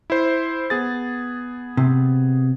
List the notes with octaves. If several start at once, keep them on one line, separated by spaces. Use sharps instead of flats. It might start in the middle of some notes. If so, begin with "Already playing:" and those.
E4 C5
B3 G#4 A6
C3